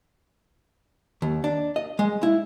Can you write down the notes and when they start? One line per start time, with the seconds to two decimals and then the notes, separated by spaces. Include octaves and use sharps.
1.22 D#2
1.44 D4
1.76 D#5
1.99 G#3
2.23 E4